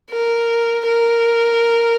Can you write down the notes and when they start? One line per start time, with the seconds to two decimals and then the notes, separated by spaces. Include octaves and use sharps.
0.10 A#4
0.85 A#4